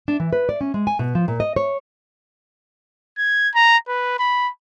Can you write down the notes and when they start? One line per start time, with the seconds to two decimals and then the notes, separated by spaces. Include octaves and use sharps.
0.08 D4
0.20 E3
0.33 B4
0.49 D5
0.61 C#4
0.74 G#3
0.87 G#5
0.99 B2
1.15 F3
1.28 A#2
1.40 D#5
1.56 C#5
3.18 G#6
3.55 A#5
3.88 B4
4.19 B5